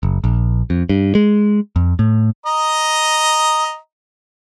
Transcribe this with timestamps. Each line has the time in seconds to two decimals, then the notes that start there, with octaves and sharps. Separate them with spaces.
0.03 F#1
0.24 A#1
0.70 F2
0.89 G2
1.15 G#3
1.76 F2
1.99 A2
2.46 D#5 A#5